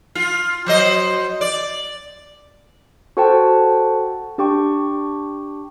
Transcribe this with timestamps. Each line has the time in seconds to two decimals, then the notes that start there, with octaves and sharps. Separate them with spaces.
0.15 F4
0.66 F#3 C5 D#5
1.41 D5
3.17 F#4 A4 C5 F#5 G5 A5
4.38 D4 G4 G5 C#6